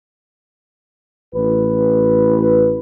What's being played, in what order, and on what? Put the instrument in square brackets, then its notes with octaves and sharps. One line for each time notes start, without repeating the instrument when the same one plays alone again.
[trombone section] A1 B4